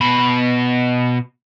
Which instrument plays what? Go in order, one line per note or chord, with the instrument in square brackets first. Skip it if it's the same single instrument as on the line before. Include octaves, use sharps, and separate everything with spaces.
[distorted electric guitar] B2 B5